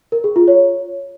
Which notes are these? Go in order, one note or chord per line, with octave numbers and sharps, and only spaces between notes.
A#4
G#4
F4
C#5